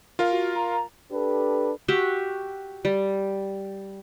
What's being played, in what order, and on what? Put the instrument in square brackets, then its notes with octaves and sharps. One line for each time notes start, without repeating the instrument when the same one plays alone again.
[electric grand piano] F4 A#4 F5
[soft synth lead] F#4
A#5
[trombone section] D4 G4 A4 B4
[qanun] F#4 G4 E5
G3